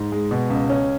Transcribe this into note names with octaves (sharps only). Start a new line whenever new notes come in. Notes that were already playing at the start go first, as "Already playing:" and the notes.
Already playing: G#2
G#3
B2
C#2
C#4